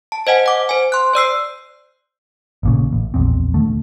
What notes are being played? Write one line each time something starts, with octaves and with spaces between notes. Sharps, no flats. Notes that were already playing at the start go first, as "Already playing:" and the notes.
A5
C5 D#5 F#5 G#5
F#5 D6
C5 G#5
C6 F#6
C5 D5 E6 C7
A1 A#2 C#3
A1
D1 A#1 E2 C4
D#1 D3 A3